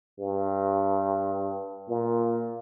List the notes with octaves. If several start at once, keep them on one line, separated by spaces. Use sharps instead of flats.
G2
A#2